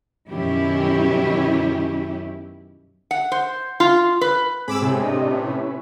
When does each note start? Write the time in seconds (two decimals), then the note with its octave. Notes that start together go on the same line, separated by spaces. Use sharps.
0.29 F#2 B2 D#3 C#4 E4 G4
3.11 F#5
3.32 C5
3.80 F4
4.21 B4
4.68 G#2 C4 G#4 B5 D6 E6
4.82 A2 C3
5.03 D4 D#5
5.31 C#4 E4 B4